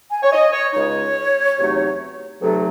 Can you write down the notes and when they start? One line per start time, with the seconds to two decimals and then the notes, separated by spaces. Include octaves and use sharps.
0.11 G#5
0.23 C#5
0.32 D#5
0.53 C#5
0.73 C#2 C#3 G#3 D#4 C#5
1.58 E2 C3 F#3 A3 D#4
2.41 E2 C3 F#3 A3 D#4 A4